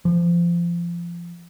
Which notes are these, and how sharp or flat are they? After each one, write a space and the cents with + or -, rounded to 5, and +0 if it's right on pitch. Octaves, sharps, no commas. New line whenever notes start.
F3 -25